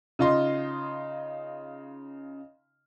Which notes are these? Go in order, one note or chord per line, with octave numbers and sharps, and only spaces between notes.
C#3 D#4 F4 D#5 C6